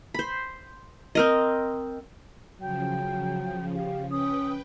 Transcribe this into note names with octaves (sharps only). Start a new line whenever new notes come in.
C5 B5
C4 A#4 D#5
C#3 F3 F#3 G5
G4 F5
C#4 B4 G5 D#6